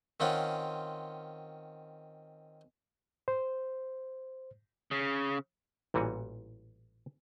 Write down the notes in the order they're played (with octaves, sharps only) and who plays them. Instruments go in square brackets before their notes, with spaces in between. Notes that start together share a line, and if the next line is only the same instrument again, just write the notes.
[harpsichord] D#3 C4 C#4 F4 F#5
[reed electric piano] C5
[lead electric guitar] C#3
[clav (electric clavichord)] A1 A#2 E3 G3 F#4 G#5